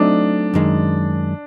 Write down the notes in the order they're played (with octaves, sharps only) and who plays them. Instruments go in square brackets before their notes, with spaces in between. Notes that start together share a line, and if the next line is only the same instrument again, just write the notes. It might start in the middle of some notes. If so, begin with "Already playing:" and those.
Already playing: [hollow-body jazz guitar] F#3 A3 C4 D#4 [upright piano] D4
[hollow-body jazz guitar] F#2 D#3 G#3